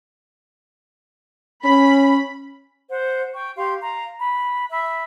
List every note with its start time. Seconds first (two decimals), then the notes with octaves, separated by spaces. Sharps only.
1.64 C#4 B5
2.89 C5 F#5
3.35 G5 C#6
3.56 G4 F5 C6
3.82 F5 A#5
4.19 B5
4.70 E5 B5